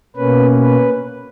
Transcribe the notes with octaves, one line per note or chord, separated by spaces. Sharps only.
B2 A#3 C#4 B4
B4